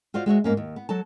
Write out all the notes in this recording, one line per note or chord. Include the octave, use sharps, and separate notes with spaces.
F4 F#4 C5 D5 F5
G#3 F#4 C#5 E5
G#2 A#3 C#4
D#2
B3
F#3 A4 A5